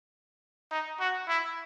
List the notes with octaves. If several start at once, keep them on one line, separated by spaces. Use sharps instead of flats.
D#4
F#4
E4